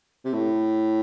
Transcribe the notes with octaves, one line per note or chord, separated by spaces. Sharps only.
C3
A2